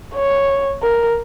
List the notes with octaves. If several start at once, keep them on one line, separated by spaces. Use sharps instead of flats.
C#5
A#4